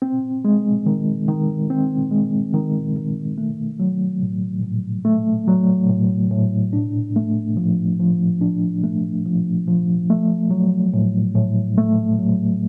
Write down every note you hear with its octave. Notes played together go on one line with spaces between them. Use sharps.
C4
G#3
D#3
D#3
C4
G#3
D#3
D#3
A3
F#3
A2
A2
A3
F#3
A2
A2
D4
A3
F3
F3
D4
A3
F3
F3
A3
F#3
A2
A2
A3
F#3